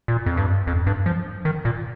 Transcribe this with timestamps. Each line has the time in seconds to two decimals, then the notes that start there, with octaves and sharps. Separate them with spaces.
0.08 A#2
0.26 F2
0.37 G2
0.67 F2
0.87 G2
1.06 F3
1.45 D#3
1.65 A#2